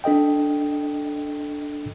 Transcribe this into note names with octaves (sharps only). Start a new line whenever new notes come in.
D4 A4 D#5 G5